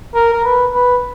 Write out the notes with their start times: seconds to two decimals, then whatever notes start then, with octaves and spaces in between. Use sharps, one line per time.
0.15 A#4
0.33 A#4
0.45 B4
0.75 B4